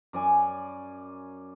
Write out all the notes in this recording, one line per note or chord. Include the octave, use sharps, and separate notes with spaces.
F#2 D5 G#5